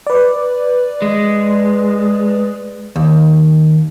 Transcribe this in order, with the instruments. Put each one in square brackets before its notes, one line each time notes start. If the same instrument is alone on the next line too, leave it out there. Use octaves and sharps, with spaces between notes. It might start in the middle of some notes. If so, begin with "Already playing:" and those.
[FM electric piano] B4 D5
[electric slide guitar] G#3
[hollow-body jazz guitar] D#2